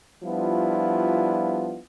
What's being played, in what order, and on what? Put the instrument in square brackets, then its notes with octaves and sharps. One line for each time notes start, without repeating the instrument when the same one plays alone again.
[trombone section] F3 G3 B3 D4 E4 F4